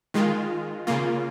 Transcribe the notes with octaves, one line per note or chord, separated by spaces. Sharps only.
D#3 G#3 F4
C#3 A#3 F4